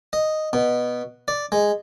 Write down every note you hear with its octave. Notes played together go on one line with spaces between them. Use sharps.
D#5
B2
D5
G#3